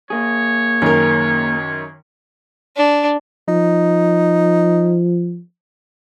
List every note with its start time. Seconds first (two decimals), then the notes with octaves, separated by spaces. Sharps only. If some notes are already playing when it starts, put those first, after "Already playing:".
0.10 A#3 G#4 C#5
0.82 F#2 D#3 C#4 A#4
2.76 D4
3.48 F3 D#4